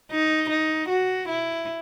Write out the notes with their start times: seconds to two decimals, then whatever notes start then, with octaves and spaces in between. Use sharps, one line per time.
0.11 D#4
0.50 D#4
0.89 F#4
1.29 E4